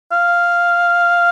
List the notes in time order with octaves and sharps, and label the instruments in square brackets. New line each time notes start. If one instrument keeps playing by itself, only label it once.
[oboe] F5